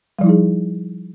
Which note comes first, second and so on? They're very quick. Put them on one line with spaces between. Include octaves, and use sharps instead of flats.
G3 F3 E4 D#4 G#4